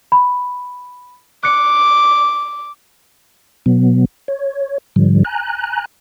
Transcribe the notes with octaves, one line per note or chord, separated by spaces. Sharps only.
B5
D6 F#6 C#7
B2 F#3 B3
C#5
G#2 D3 F3 G3
G#5 A#5 F#6